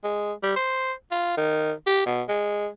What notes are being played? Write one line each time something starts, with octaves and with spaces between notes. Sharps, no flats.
G#3
G3
C5
F4
D#3
G4
B2
G#3